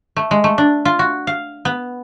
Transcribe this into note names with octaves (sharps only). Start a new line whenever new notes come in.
A3
G#3
A3
D4
F4
F#4
F5
B3